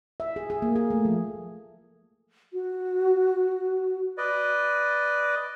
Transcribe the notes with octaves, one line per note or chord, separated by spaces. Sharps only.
E5
G#4
G#4
A#3
G#4
A3
F3
F#4
B4 D5 D#5